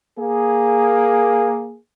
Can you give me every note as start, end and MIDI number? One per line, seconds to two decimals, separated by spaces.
0.19 1.77 58
0.19 1.77 68